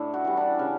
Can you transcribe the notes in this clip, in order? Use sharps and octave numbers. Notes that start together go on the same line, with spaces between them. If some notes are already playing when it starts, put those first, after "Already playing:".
Already playing: A2 D4 E4
F#4
E3 G3
D4
C#3 C#4